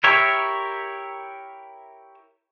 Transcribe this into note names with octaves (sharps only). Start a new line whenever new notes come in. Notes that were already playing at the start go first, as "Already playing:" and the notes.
E4 G4 A#4 C#5 E5